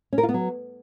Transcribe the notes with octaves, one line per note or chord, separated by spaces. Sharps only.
C#4
A#4
F4
B3
F#3